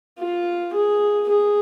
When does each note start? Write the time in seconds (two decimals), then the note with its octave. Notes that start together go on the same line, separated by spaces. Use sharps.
0.19 F4
0.74 G#4
1.29 G#4